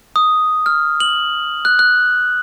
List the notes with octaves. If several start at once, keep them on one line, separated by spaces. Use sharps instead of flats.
D#6
F6
F#7
F#6
F#6